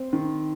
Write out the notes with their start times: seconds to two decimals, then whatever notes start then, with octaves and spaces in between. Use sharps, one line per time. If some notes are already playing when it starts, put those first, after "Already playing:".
Already playing: C4
0.13 D#3